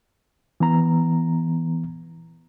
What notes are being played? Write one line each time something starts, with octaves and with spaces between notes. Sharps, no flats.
E3 B3 A#5